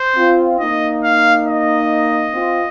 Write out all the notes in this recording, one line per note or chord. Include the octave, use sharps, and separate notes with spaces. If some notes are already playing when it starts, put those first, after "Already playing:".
Already playing: C5
C4 F4
A#3 D#4 D#5
F5
D#5
C4 F4